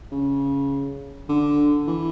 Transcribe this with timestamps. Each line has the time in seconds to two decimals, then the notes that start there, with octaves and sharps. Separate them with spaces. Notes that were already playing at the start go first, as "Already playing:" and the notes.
0.12 C#3
1.29 D3
1.87 E3